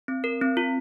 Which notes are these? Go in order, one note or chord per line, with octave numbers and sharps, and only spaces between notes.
C4
A#4
C4
F4